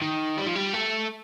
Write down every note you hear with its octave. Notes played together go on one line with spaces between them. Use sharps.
D#3
G3
F3
G3
A3